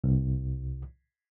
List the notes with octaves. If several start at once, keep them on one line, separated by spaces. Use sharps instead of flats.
C2